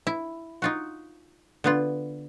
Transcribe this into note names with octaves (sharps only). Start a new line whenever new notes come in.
E4
D#4 F4 F#4
D3 B3 F4